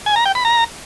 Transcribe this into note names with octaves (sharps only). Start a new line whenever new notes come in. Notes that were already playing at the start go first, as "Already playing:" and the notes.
G#5
A#5
G5
B5
A#5